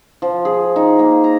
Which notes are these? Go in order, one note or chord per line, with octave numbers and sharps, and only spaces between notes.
F3
G#4
D#4
A#3
A#5